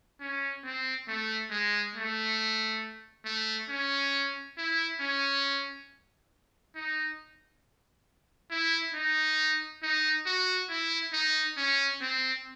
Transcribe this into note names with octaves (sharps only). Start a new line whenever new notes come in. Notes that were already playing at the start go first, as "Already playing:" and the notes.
C#4
C4
A3
G#3
A3
A3
C#4
E4
C#4
D#4
E4
D#4
D#4
F#4
E4
D#4
C#4
C4